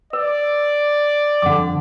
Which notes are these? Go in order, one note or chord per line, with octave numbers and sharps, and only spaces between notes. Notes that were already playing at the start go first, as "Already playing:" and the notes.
B4 D5
F2 D3 F#5 D6